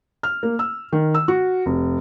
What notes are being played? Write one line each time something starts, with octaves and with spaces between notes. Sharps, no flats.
F6
A#3
E6
D#3
E6
F#4
F1